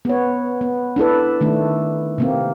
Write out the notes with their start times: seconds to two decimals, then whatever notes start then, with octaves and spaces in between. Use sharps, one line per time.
0.05 B3 C#5
0.61 B3
0.96 D4 E4 A4 B4
1.41 D#3 A3 D4
2.18 C3 A#3 C4